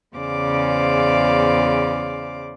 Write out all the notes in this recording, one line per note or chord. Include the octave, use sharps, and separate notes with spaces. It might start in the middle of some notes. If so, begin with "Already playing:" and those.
E2 C#3 C5 D5 F5 D6